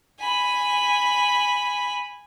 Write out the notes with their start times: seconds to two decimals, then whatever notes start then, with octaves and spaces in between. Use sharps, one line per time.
0.20 G#5 B5